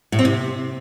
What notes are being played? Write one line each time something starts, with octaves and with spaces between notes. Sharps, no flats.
A2
C4
C3